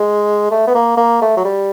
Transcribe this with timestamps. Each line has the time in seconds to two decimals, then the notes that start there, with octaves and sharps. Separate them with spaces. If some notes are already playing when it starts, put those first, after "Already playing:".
Already playing: G#3
0.51 A3
0.67 B3
0.74 A#3
0.97 A#3
1.22 A3
1.37 F#3
1.45 G3